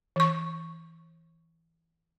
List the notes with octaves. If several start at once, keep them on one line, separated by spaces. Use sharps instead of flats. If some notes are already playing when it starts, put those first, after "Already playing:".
E3 C#6